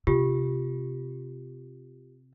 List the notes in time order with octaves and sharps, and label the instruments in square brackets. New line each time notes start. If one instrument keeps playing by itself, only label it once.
[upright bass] C3 [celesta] F4 G4